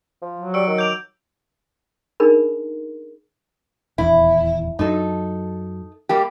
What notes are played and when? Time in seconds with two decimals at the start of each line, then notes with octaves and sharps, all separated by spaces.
0.22 F3
0.38 F#3
0.54 G3 C#6 E6 D7
0.67 D#3
0.78 D6 G6 F7
2.20 D4 D#4 G#4 A#4 B5
3.98 D#1 E2 E4
4.79 F#2 F#3 D#4 A4
6.09 G3 A#3 G4